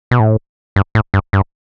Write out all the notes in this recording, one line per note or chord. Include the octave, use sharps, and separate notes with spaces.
B2
A2
G2
A2
G2
G2